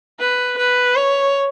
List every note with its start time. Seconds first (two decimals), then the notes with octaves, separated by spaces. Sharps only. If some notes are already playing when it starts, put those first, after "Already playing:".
0.19 B4
0.58 B4
0.95 C#5